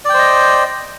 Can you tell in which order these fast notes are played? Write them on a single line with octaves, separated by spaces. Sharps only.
D5 G5 C5 D#5